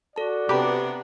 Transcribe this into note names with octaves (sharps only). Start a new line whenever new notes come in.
F#4 A4 D5 A5
C3 B3 D4 G4 B4 A5 A#5 D6